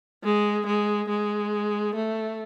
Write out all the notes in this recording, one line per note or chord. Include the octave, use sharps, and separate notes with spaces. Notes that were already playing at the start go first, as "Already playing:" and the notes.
G#3
G#3
G#3
A3